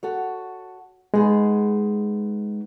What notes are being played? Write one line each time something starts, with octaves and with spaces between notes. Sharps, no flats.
F#4 A4 C#5
G#3 B3 D#4 G#4